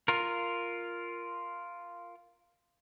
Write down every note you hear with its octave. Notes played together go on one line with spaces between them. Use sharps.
F4 A#4